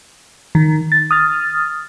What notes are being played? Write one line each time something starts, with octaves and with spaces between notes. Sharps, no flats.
D#3
A6
D#6 F6 A6